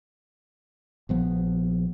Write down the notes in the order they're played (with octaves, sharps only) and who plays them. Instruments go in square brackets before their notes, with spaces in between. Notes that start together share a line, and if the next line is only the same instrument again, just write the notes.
[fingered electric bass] A#1 F3 B3